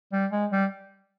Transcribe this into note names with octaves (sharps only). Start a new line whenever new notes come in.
G3
G#3
G3